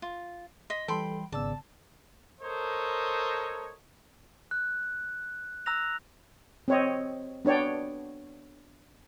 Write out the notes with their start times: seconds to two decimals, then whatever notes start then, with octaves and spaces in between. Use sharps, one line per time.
0.02 F4
0.70 D#5 C6 B6
0.88 E3 G3 A4 G5 B5 C6
1.32 G#1 C#3 B3 D5 A5 E6
2.40 A4 A#4 C5 C#5 D#5
4.51 F#6
5.66 A#5 E6 F#6 A#6 F7
6.68 C4 C#5 D#5
7.45 B3 D4 C#5 D5 G5